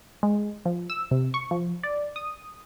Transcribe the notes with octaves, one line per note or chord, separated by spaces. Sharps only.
G#3
F3
E6
C3
C#6
F3
D5
D#6